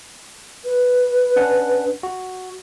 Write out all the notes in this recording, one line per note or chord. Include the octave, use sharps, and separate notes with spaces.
B4
C#4 D4 F#5
F#4